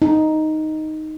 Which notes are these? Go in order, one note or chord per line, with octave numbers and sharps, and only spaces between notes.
D#4